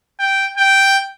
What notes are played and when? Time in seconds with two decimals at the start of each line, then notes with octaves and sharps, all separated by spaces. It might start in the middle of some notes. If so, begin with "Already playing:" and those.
0.19 G5
0.57 G5